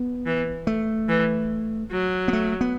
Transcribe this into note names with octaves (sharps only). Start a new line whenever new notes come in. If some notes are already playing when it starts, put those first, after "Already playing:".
Already playing: B3
E3
A3
E3
F#3
B3
A3
B3